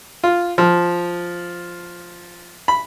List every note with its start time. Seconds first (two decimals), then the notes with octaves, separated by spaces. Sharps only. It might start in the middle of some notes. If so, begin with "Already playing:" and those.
0.24 F4
0.58 F3
2.68 B5